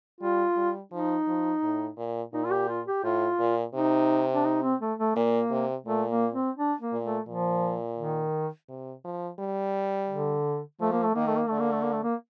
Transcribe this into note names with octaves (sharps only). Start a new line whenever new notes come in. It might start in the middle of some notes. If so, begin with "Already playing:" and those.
G3 F4
G3
F3 D#4
F3
A2
A#2
A#2 D#4
F4
G4
F4
G4
A2 F4
A#2
C3 D#4
D4
D#4
C4
A3
A3
A#2 A#3
C3
A#2 A3
A#3
C4
D4
A#3
A#2
A3
A#2 F3
D#3
C3
F3
G3
D3
F3 A3
A#3
A3
D#3 A#3
A3
A#3
D3 A3
A#3
A3
A#3
A3
A#3